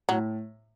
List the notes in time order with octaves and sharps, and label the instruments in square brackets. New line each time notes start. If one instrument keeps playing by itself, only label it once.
[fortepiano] A2 [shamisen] F#3